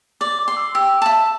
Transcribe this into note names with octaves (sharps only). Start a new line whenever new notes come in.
D5 D6
D6
C6
E6
G4 E6
E5 A5